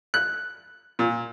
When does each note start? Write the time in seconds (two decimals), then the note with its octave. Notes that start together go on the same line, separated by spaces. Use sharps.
0.14 F#6
0.99 A#2